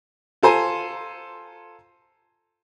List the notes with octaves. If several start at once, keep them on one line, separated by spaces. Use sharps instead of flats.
F4 A4 C5 G#5 A#5